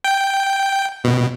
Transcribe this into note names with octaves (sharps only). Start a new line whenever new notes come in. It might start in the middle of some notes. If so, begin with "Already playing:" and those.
G5
B2